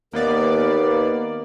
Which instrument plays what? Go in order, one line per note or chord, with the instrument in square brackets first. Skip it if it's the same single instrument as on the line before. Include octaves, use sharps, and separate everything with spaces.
[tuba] D#2 [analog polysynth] A#3 B3 D5 [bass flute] A#4